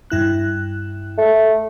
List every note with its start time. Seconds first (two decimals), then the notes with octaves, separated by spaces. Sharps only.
0.10 G2 E4 F#6
1.18 A3